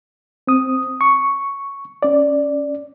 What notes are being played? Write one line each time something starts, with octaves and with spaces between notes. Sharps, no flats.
C4 D#6
C#6
C#4 D5